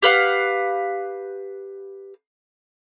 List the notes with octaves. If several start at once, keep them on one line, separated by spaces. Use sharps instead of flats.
G4 B4 F5 F#5